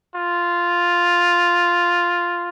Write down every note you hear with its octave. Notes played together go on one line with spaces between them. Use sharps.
F4